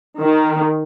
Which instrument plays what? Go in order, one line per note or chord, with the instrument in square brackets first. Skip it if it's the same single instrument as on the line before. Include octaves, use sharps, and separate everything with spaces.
[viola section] D#3